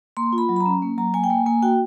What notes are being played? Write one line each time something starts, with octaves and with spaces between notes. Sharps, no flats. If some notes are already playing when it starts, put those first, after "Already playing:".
A#3 C6
F4
B5
F#3
B5
A#5
C#4
A#3
F#3 A#5
A#3 G#5
G5
A#3 G#5
A#3 G#5
F#4 G5